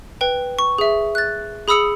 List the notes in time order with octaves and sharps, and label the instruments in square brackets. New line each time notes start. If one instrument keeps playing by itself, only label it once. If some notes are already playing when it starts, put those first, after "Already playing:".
[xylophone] B4 G5
C#6
G#4 E5
F#6 A6
G#4 B5 D#6 E6 C#7 F#7